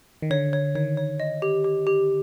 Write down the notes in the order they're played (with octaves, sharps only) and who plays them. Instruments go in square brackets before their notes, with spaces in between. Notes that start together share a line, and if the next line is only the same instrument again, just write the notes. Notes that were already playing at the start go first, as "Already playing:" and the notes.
[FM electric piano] D#3
[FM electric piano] D3 [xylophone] C#5
[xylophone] C#5
[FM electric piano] D#3 [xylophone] C#5
[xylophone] C#5
D#5
G4
G4
G4